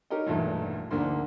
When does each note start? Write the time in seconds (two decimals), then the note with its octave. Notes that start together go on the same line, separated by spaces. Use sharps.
0.10 D#4 G4 A#4 C#5 D#5
0.26 B1 E2 G2 A#2 E3 A3
0.91 D2 G#2 D3 A#3 D4 C6